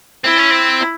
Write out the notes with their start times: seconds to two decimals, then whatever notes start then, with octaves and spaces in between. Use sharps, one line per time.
0.24 C4 E4
0.37 C#4
0.51 C4